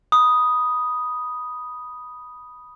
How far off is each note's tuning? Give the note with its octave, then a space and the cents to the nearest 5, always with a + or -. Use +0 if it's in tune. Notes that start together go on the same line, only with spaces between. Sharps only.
B5 -10 D#6 +0